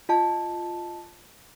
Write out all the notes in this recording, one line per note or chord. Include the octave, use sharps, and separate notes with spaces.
F4 D#5 A5